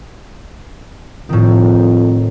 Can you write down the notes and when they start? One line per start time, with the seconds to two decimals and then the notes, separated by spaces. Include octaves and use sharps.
1.29 F2 A2 D#3